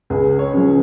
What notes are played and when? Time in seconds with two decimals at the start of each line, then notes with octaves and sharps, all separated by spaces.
0.10 C#2 G#4
0.39 C#5
0.54 C#3 F3